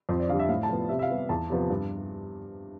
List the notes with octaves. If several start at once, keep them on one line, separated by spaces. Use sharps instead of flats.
F2 C5
D5
D3 G3 F5
E5
A2 F5
A5
F3 B3
C3 E5
E5
F5
G3 B3
E2 A5
C3 F3 B3
G2